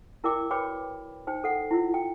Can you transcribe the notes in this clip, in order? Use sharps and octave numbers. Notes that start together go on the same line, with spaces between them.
E4 A#4 D5 G5 D6
F#4 B4 C#5 G5 B5 D6
D#4 C5 G5
A4 F#5
E4 F4
G5